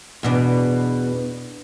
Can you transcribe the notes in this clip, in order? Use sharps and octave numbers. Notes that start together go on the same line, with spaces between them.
E2 B2 D4